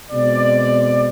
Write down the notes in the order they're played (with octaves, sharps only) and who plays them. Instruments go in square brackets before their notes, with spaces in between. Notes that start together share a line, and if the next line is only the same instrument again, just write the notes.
[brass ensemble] B2 G#3 C4 D5